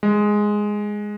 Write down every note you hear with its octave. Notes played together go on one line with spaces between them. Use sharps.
G#3